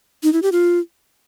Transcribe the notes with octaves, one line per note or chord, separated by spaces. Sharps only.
D#4
E4
G4
F4